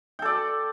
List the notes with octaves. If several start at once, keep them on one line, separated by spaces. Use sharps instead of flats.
A4 D5 G5